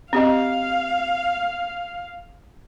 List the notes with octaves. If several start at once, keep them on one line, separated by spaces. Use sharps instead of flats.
C4 G4 D#5 F5